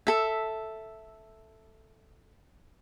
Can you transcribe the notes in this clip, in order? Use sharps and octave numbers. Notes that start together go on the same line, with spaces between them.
A4 E5